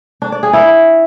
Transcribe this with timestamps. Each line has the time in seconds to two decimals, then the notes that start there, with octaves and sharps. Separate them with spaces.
0.22 D4
0.32 D5
0.43 G#4
0.53 E4